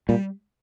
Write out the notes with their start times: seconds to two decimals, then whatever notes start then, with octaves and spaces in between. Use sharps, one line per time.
0.09 A#2 G3